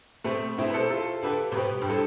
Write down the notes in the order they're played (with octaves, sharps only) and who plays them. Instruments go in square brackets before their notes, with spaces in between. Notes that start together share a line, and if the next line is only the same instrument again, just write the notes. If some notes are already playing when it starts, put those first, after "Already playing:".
[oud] B2 [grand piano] A3 C4
[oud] B2 [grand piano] C4 E4
[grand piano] B4
A4 C5
F4 A4
[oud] D3 [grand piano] G4 B4
[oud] C3
[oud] B2 [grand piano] G4 B4
[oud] G2
[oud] A2 [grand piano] A4 C5